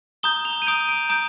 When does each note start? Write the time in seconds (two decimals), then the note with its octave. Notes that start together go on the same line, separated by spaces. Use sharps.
0.23 A#5 D#6 G6 G7
0.45 F7
0.62 D#7
0.67 A#5 D#6 G6 D7
0.89 D7
1.09 A#5 D#6 G6 D7